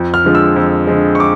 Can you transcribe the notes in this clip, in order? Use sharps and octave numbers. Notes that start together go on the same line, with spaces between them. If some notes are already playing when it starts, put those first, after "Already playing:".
Already playing: F2
F6
D3 F3 G#3
E6
F2
D3 F3 G#3
C#6
D6